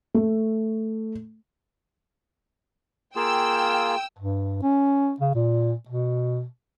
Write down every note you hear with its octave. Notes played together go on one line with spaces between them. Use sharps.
A3
A#3 F4 G#4 G5 E6
G2
C#4
C#3
A#2
B2